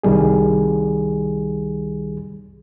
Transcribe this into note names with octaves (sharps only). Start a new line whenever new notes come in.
C2 D#3 G3 G#4